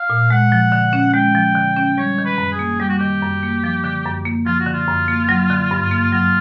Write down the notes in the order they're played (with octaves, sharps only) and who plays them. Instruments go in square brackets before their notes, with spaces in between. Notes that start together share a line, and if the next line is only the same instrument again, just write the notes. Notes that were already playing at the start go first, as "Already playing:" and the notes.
Already playing: [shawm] F5
[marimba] A#2
[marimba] G#3 [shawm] F#5
[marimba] F3
D3
C#4
[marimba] G#3 [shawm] G5
[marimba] F3
D3
C#4
[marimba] G3 [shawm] C#5
[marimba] D#3
[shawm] B4
[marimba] F#2
[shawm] G#4
[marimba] A#3
[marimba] G3 [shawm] G4
[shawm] F#4
[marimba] D#3 [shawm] G4
[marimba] F#2
A#3
F3
D3
F#2
A#3
[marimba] F3 [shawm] F4
[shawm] F#4
[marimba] D3
[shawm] F4
[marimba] F#2
A#3
F#3
D3
G2
A#3
[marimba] F#3 [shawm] F4